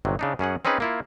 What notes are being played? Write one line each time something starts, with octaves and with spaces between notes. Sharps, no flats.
G1 C3 F#3
C#3 D4 D#4
F#2 C#4 G#4 F#5
C4 C#4 D#4 G#4 B4
A#3 E4 F4